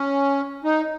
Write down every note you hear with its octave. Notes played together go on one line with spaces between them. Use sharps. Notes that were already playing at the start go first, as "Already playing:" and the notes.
Already playing: C#4
D#4